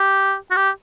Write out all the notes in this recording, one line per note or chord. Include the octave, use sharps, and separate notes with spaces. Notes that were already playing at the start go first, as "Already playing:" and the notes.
Already playing: G4
F#4
G4